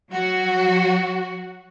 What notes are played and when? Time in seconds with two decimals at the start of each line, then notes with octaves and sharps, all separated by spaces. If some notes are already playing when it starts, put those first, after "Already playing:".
0.11 F#3 F#4